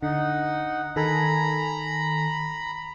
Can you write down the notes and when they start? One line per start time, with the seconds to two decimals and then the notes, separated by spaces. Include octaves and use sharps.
0.03 D3 D#4 F#5
0.96 D#3 A4 G#5 A#5 B5